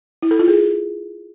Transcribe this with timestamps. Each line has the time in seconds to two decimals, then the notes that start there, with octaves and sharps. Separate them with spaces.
0.22 E4
0.31 A4
0.39 F4
0.48 G#4